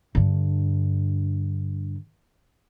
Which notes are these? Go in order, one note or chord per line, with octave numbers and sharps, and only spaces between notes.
G2 D3